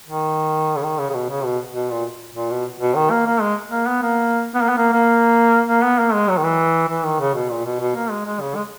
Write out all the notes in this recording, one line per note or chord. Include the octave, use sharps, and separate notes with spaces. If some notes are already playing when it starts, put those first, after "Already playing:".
D#3
C#3
D#3
C#3
C#3
B2
C#3
B2
B2
A#2
A#2
B2
B2
D#3
A#3
A#3
G#3
A#3
B3
A#3
B3
A#3
B3
A#3
A#3
A#3
B3
A#3
G#3
F#3
D#3
E3
E3
D#3
C#3
B2
A#2
B2
B2
A#3
G#3
G#3
C#3
G#3